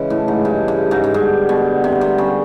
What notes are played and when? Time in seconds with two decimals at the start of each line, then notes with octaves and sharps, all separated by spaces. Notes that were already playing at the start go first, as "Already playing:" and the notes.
Already playing: C#3 E3 G#3 C#4 E4
0.10 A2
0.28 G#2
0.45 G2
0.68 G2
0.91 G#2
1.04 G#2
1.14 G2 D3 G3 B3
1.49 B2
1.84 C3
2.01 C3
2.18 C#3